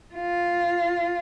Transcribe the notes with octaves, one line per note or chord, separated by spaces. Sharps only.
F4